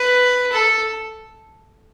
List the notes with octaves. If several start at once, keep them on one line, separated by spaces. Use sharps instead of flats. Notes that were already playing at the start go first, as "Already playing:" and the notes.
Already playing: B4
A4